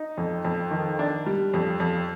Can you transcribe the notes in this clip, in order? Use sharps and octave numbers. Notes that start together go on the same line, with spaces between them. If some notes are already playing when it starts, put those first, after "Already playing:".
Already playing: D#4
F2
F2
D#3
D4
G3
F2
F2